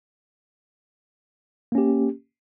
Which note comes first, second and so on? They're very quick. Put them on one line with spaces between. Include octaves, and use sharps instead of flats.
A#3 C#4 G4